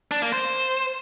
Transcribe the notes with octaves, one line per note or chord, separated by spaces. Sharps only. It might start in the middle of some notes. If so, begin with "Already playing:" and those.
D4
A#3
C5